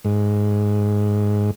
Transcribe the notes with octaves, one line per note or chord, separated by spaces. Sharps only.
G#2